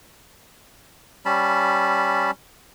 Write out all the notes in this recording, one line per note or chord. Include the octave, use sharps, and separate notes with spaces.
G3 C#4 A5 B5